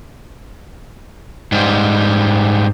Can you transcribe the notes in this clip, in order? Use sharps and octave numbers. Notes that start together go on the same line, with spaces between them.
G#2 G3